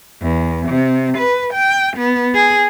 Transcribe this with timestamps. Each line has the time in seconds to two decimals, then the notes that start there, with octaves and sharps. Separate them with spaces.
0.22 E2
0.69 C3
1.18 B4
1.54 G5
1.98 B3
2.34 G#4